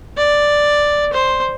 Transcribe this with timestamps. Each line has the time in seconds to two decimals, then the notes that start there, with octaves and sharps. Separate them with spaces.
0.17 D5
1.13 C5